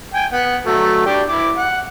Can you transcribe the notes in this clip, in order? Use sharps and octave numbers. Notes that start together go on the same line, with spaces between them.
G5 G#5
B3 F#5
F#3 A3
D4 G4
E4 D6
F#5